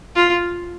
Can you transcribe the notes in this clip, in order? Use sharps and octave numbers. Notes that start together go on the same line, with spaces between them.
F4